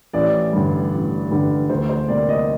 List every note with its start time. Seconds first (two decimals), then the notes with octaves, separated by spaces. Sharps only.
0.13 A1 D5
0.53 G2 D3 G3
0.92 A1
1.31 G2 D3 G3
1.70 D2 C5
1.89 C5
2.08 C3 G3 A#3 D5
2.29 D#5